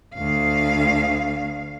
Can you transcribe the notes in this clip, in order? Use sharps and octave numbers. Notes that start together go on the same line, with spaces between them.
D2 F5